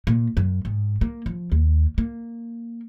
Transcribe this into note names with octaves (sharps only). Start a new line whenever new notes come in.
A#2
F#2
G#2
A#3
F3
D#2
A#3